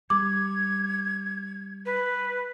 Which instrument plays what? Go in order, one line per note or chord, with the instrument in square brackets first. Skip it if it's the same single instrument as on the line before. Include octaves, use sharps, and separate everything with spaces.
[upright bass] G3 [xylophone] D6 [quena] G#6
[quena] B4